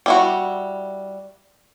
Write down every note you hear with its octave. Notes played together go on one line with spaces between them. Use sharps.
G3 E4 F#4